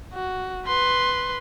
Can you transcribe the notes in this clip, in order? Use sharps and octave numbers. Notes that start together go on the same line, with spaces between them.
F#4
B4 C6